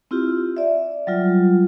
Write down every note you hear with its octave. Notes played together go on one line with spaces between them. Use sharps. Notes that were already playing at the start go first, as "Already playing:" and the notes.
C4 E4 F4 G4
D5 E5
F#3 G3 F4